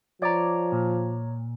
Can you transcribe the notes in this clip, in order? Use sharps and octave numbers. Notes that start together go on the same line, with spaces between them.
F3 C#5 D5 A#5
A#2